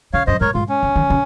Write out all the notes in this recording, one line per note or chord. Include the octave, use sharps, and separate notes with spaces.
C#3 C#5 F5
F#2 C5 D#5
G#2 A#4 C#5
G#2 F4
C#4
C#3
D#3
C#3